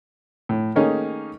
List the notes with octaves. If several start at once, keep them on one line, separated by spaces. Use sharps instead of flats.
A2
D#3 A3 A#3 C#4 D#4 G#4